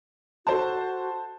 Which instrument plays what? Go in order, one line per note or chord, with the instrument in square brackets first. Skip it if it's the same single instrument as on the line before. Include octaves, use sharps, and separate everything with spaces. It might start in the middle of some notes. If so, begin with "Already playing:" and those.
[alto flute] F#4 [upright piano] A4 C5 A5